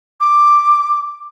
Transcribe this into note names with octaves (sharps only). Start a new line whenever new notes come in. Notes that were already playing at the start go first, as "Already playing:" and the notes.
D6